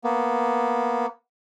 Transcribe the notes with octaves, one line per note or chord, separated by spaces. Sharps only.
A#3 B3